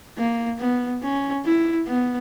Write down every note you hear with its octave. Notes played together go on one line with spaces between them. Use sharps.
A#3
B3
C#4
E4
B3